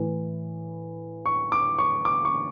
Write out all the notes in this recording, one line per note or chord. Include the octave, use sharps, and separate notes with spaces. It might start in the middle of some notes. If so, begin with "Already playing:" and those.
Already playing: A2 E3
C#6
D6
C#6
D6
C#6